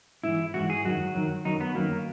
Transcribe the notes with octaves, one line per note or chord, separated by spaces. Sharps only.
G#2 E3 E4
G#2 E3 F#4
G#4
F#2 D#3 F#3 F#4
F#2 D#3 F#3
F#2 D#3 F#3 D#4
B3
F#2 D#3 F#3 A#3